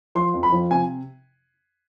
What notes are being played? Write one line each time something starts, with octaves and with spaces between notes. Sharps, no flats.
F3 C6
F2
B5
F3
C3 G#5